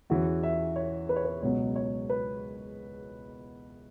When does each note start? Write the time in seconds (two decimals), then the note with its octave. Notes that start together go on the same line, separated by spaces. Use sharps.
0.10 E2 E3 C#4 F#4
0.43 E5
0.76 C#5
1.09 B4
1.16 C#5
1.25 B4
1.42 C#2 B2 F#3 B3 C#5
1.76 C#5
2.10 B4